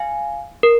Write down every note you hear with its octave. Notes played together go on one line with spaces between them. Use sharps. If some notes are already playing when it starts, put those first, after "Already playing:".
Already playing: F5 G#5
A#4